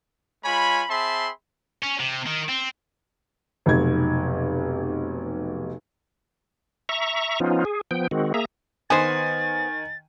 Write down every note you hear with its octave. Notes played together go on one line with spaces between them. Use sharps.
G#3 F4 C#5 G#5 B5
C4 G#4 E5 A5 B5 C6
C#4
C3
D#3
C4
F1 B1 G#6
E5 A#5 C#6
F3 B3 C#4 D#4 F4
G#4
F3 B3 G5
D#3 G#3 C4 F#4
A#3 G#4 E5 A#5
D#3 B3 C5 G#5 A6